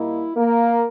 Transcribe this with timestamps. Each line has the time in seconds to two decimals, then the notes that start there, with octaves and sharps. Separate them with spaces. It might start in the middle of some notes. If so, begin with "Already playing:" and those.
Already playing: A#2 G3 A#3 D#4 E4
0.36 A#3 A#4